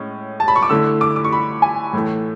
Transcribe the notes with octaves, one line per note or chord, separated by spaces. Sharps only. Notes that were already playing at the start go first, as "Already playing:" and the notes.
Already playing: A2 G#3 C#4
A5
B5
C#6
D6
D3 A3 E4 E6
D6
D6
C#6
B5
G#5
A2 E3 A3